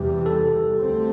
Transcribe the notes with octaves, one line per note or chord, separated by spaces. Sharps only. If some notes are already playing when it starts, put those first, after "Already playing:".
Already playing: E2 C3 E3 G3 G4
A4
D2 D3 A3 C4